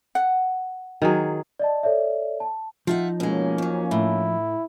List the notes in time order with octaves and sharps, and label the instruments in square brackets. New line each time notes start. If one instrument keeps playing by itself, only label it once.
[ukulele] F#5
[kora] D#3 F#3 G#4
[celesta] D5 D#5 A5
A4 C#5 D5 E5
A5
[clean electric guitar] F3 D#4 [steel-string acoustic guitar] F4 E5 F#5
[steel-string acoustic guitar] B2 G#3 [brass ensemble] A#3 C#4
[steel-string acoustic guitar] F2 F#3
[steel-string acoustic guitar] A2 [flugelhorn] E4